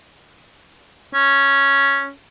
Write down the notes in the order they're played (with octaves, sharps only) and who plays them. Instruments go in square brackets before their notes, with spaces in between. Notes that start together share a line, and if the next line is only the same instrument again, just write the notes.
[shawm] C#4